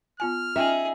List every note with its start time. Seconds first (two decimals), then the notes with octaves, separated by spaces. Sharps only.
0.20 B3 F4 G#5 F6
0.56 C#4 D#4 F4 G#4 E5 G5